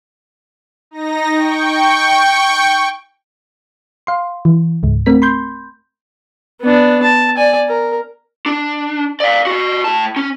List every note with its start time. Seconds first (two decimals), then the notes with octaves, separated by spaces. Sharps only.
0.91 D#4 A#6
1.33 G5 C#6
4.07 F5 C6
4.45 E3
4.83 C#2 G#2
5.06 A3 C4 A#4 B6
5.22 B5 C6 G6
6.61 B3 D4
7.03 A5
7.37 D5 G#5
7.69 A#4
8.46 D4
9.20 D5 F5
9.47 F#4 D#5
9.84 A2 A5
10.16 C#4